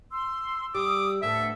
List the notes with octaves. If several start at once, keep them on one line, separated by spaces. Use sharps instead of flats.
C6 E6
G3 D6 D#6
D2 A2 B3 A4 E5